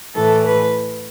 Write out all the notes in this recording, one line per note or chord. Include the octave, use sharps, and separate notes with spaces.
A2 E3 A3 A4
B4